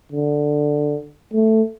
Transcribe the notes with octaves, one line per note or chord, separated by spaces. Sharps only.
D3
A3